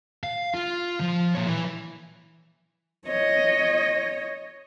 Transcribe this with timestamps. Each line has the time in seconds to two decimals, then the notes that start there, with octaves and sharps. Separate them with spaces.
0.24 F5
0.55 F4
1.01 F3
1.35 A#2 C#5
1.47 E3
3.07 C#5 D#5